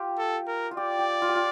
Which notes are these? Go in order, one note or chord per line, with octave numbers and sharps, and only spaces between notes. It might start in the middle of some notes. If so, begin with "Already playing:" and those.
Already playing: F4 G4
A4
A#4
F4
G4 D5
G4
F4
G4
F4